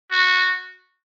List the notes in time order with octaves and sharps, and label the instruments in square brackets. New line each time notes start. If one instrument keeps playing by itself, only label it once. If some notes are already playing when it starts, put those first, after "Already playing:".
[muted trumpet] F#4